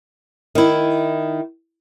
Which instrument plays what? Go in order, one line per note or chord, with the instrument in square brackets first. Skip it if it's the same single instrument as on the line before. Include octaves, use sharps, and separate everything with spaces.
[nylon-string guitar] D#3 E4